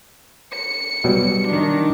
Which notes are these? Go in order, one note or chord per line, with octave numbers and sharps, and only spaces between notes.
C#7
B2 F#3 G3
D#3 D4